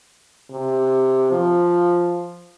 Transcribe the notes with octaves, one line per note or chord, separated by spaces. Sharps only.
C3
F3